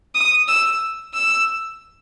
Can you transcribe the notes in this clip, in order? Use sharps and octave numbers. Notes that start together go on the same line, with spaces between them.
D#6
E6
E6